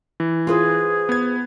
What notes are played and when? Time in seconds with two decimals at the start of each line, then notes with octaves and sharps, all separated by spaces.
0.20 E3
0.47 F4 G#4 B4 C5
1.09 B3 G#6